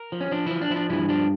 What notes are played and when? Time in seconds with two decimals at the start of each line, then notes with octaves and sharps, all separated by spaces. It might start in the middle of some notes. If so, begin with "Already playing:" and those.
Already playing: A#4
0.12 F3
0.21 C#4
0.31 F3 D4
0.46 E3 F3 E4
0.61 D4
0.70 F3 E4
0.76 D4
0.90 G2 E3 E4
1.09 F3 D4